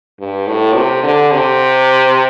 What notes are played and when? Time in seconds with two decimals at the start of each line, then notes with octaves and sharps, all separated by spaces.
0.20 G2
0.47 A2
0.76 C3
1.03 D3
1.32 C3